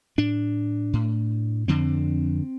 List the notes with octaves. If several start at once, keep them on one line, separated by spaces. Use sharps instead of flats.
A2 D4
A2
F2 D3 C4